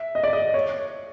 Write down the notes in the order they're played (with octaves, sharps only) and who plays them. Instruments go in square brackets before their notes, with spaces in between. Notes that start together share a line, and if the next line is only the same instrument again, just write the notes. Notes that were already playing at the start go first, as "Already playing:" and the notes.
Already playing: [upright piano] E5
D#5
D5
D#5
C#5